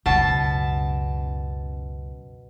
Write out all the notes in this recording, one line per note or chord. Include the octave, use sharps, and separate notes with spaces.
C#2 F#2 B2 A5